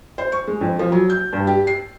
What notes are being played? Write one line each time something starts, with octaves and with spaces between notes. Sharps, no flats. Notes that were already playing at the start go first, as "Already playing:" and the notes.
C5
C#6
G#3
F2
F3
F#3
G6
G2
G4
C7